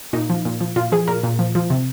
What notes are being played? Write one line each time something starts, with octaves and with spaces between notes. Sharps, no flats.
A#2 D#4
F3
A#2
F3
A#2 F4
F3 G#4
A#2 A#4
A#2
F3
F3
C3